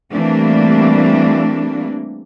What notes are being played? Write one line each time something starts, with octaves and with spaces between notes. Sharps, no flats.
E3 G3 A3 A#3 C4 D4